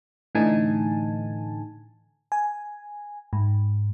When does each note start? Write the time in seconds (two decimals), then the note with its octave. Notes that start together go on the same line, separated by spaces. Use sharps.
0.35 A2 D3 E3 D#4 G#5 A5
2.32 G#5
3.33 G#2